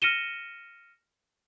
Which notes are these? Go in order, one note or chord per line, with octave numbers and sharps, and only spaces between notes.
F6 A#6 C#7 D#7 E7 G7